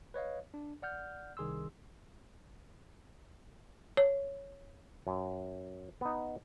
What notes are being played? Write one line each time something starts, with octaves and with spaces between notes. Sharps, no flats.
B4 C#5 D#5 F5
D4
D5 F#5 F6 G6
C2 D#3 G#4 C6 E6
C#5
F#2
B3 D#4